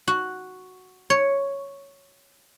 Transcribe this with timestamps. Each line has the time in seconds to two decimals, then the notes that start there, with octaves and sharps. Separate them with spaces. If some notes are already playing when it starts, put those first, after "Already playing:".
0.08 F#4
1.10 C#5